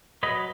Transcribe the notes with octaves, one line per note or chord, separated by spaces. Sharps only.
F#3 B4 D#5